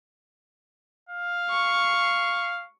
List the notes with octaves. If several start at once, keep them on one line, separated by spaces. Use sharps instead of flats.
F5
C#6